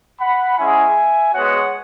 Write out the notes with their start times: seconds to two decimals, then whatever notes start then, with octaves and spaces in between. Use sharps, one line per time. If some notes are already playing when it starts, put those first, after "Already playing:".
0.20 F#5 B5
0.58 G#3 C#4 E4 E5 G#5
1.33 G#3 B3 F#4 C#5 F#5